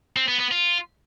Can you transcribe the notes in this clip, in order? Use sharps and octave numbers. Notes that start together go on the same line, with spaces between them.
C4
B3
B3
F4